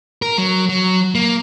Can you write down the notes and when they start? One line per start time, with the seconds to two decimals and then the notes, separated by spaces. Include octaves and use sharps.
0.22 A#4
0.38 F#3
0.69 F#3
1.15 A#3